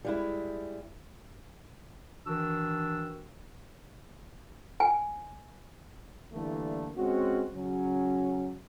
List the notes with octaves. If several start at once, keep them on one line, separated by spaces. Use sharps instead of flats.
G3 G#3 E4
D#3 E3 D4 F#4 E6
G#5
D3 E3 G3 A3 A#3
G#3 C4 C#4 F#4
C#3 F#3 C#4